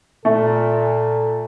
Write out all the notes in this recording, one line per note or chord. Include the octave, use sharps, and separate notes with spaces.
A#2 A3 A4